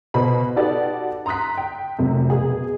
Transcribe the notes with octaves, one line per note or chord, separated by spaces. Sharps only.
B2 C5 B5
D#4 F#4 G4 A4 B4 D5
A#5 C6 D#6 F#6 B6
G5
F1 F#2 C3
B2 G#4